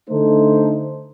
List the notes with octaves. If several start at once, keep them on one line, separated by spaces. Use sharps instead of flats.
D3 A3 D#4 A4 C5